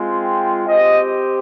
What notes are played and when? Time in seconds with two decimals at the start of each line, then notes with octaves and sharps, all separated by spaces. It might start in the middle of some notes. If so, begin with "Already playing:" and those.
Already playing: G#3 C4 F4
0.21 G5
0.67 C4 G4 D#5